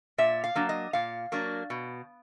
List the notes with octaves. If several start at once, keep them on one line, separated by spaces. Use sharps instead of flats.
A#2 E5
F5
F#3 A#3 D4
D#5
A#2 F5
F#3 A#3 D4
B2